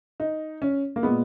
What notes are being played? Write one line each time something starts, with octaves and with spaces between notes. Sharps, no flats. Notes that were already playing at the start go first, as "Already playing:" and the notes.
D#4
C#4
A#3
A#2 G#3 B3